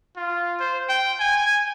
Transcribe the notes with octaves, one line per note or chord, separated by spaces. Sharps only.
F4
C5
G5
G#5